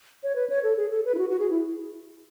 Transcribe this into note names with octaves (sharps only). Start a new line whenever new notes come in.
C#5
B4
C#5
A4
G#4
A4
B4
E4
F#4
F#4
G#4
E4